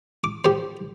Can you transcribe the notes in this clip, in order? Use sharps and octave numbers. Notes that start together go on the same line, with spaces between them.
D6
G4 C5